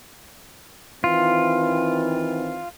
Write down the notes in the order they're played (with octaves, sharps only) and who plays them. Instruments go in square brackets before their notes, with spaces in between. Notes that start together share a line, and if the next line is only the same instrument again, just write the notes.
[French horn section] D#3 E3 C4 [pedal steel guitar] F4